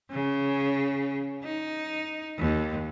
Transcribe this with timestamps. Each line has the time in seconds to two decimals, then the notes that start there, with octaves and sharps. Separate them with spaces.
0.11 C#3
1.44 D#4
2.38 D#2